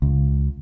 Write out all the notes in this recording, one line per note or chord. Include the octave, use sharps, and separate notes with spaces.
C#2